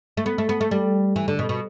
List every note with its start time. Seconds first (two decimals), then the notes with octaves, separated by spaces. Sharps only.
0.17 A3
0.26 B3
0.38 A3
0.49 B3
0.61 A3
0.71 G3
1.16 E3
1.28 D3
1.39 B2
1.49 B2